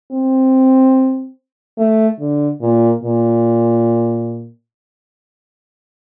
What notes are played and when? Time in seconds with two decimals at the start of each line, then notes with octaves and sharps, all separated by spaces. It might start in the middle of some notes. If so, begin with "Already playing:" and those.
0.12 C4
1.78 A3
2.20 D3
2.61 A#2
3.03 A#2